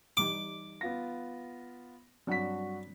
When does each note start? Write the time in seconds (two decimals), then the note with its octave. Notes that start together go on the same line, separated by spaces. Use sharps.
0.17 E3 G3 D#4 D6
0.81 B3 F4 A#6
2.27 G2 F#3 C4 D4 F#4 B6